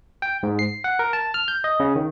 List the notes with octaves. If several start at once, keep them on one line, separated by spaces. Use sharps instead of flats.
G5
G#2
C7
F#5
A#4
A5
F6
G6
D#5
C#3
D#3